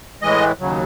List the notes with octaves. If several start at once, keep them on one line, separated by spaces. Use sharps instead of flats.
A2 E3 G#3 D#5
D#2 C#3 F#3